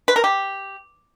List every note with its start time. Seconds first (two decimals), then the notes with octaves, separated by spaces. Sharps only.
0.08 B4
0.16 A#4
0.24 G4